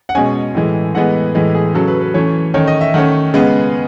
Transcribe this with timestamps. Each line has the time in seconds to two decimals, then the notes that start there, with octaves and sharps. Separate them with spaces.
0.09 F#5
0.15 B2 G#3 C#4 G#5
0.55 A2 E3 G#3
0.94 A2 E3 G#3 B3 F#5
1.35 A2 E3 G#3
1.55 G#4
1.74 C#3 F#3 C#4 A4
1.88 B4
2.01 B4
2.14 E3 A3 C#4 C#5
2.54 D#3 A3 C#4 C#5
2.67 D#5
2.81 E5
2.94 D#3 A3 C#4 F#5
3.34 C#3 G#3 B3